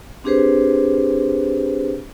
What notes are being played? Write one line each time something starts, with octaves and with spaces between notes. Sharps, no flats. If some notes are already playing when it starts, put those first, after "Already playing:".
C4 D4 G4 G#4 B4 C5